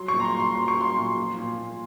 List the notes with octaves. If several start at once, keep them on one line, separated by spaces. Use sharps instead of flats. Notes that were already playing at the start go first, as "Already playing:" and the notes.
Already playing: F#3 C6
C#6
A#2
A#5
C6
A#2
C6
F#3 C6
C#6
F#3
C6
A#2
F3
A#2
A#2